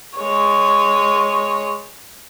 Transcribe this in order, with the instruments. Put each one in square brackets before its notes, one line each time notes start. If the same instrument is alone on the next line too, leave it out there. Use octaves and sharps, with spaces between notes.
[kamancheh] G#3 C#5